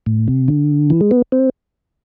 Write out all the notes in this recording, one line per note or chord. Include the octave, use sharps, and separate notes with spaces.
A2
C3
D3
E3
G#3
B3
C4